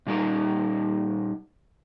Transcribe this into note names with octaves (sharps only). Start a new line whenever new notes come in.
A#2 G3 D#4 A#4